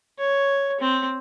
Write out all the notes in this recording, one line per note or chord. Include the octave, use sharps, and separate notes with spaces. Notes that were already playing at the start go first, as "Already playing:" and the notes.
C#5
C4